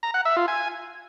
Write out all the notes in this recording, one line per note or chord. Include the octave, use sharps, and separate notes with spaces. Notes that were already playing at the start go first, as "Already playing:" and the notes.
A#5
F#5
E5
F4
G#5